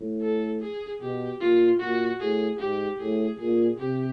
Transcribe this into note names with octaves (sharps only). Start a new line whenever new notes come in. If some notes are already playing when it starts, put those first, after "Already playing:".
Already playing: A2
A4
G#4
B2 G4
A#2 F4
A#2 F#4
A2 G#4
G#2 G4
A2 G#4
A#2 G#4
C3 G4